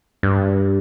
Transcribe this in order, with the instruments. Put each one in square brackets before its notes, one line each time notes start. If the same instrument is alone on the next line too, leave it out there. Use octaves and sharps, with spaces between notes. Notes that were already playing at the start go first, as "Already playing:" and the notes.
[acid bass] G2